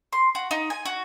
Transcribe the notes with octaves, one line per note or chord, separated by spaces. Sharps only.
C6
F#4
D#4
G#5
F#4